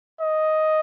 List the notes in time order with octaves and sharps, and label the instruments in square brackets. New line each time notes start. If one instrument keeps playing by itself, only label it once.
[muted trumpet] D#5